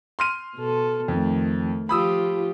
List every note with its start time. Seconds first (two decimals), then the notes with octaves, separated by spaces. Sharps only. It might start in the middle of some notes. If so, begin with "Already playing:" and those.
0.19 C6 F6 D#7
0.56 B2 A4
1.08 F2 D#3 A3
1.89 F3 F4 G4 B5 D#6 E6